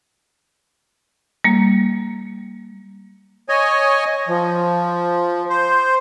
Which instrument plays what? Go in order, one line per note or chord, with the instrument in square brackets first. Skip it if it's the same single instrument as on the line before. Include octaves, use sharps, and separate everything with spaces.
[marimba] G3 A#3
[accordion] C#5 D#5 G#5
F3
C5